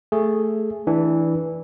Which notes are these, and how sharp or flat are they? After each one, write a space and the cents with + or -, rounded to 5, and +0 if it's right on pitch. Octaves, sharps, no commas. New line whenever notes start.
A3 +0 G#4 +0
E3 -10 D4 +0